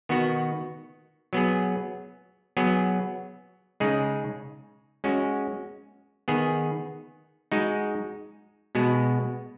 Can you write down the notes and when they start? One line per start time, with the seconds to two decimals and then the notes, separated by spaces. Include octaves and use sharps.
0.09 D#3 B3 F#4
1.33 F#3 B3 G#4
2.57 F#3 B3 G#4
3.80 C#3 G#3 D#4 G#4
5.04 G#3 C#4 F#4
6.28 D#3 B3 G#4
7.52 G#3 D#4 F#4
8.75 B2 G#3 B3 F#4